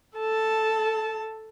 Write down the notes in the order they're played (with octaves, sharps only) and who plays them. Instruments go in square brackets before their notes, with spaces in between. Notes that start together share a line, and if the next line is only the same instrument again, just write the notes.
[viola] A4 A5